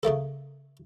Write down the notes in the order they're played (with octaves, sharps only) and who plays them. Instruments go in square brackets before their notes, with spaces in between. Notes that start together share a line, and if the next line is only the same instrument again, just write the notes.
[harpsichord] C#3 A3 A#3 A4